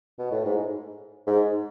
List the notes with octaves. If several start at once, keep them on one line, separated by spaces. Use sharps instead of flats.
B2
A2
G#2
G#2